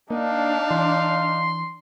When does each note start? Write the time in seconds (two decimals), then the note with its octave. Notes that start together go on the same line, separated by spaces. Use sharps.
0.11 A#3 D4 D#4 F5
0.71 E3 C6